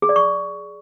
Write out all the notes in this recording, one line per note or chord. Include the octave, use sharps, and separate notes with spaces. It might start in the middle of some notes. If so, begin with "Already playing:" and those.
G#4
D5
C#6